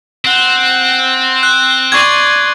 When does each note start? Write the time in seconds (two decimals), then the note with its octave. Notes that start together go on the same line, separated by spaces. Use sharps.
0.25 C4 F#5
1.43 F#6
1.92 D5 C6 C#6 G#6